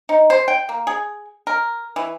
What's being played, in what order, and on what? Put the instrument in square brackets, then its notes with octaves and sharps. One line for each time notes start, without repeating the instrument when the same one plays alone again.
[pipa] D#4
C5
G5
A#3
G#4
A#4
E3